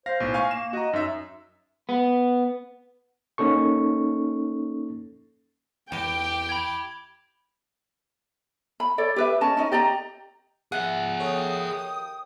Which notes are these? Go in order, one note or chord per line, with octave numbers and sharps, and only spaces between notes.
C5 F5 A#6
B1 A2
F5 G#5 C#6
A#3 E7
F#4 D#5 A#5
F#2 D#4 E5
B3
A#3 C#4 D#4 A4 C#6
E2 G4 G5
B5 G#6
B5
A4 C#5 D5
G4 B4 E5
C#4 D#5 A5
C#4 D#4 D#5
G4 D5 D#5 A#5
G#4 E5 F#5
D#2 A4 C#5 G5 D#6